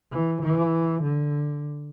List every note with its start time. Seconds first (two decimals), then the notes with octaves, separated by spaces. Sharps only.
0.13 E3
0.42 E3
1.03 D3